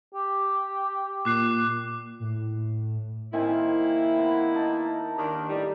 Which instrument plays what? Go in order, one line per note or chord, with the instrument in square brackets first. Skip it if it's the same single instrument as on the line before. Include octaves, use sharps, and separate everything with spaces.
[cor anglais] G4
[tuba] A#2 [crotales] D6 F#6 C7
[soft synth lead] A2
[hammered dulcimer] D#3 C4 G#5 [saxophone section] A#3 E4
[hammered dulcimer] B3
D#4 A5 A#5
[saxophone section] D#2 D#3 D4
A2 E3 G3